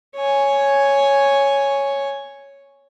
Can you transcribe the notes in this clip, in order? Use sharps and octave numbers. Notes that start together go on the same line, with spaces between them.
C#5 G#5